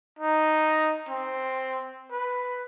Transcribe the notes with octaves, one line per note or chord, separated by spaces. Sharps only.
D#4
C4
B4